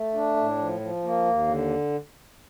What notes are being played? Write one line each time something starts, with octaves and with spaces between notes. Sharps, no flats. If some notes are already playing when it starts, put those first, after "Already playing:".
Already playing: A3
D4
A2
F3
F3
A#3
D#2
D3